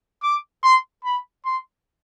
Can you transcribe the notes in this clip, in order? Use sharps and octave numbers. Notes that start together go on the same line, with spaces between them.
D6
C6
B5
C6